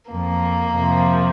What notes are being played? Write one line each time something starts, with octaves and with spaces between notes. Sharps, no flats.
F2 F3 A#3
F2 C3 F3